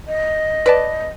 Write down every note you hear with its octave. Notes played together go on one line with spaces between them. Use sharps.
D#5
B4 D5 A5